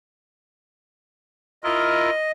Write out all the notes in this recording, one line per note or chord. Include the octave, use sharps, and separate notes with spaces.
E4 F4 A#4 D#5